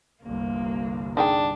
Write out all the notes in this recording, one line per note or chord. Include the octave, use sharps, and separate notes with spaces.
G1 C2 A#3
D4 D#4 G#4 G5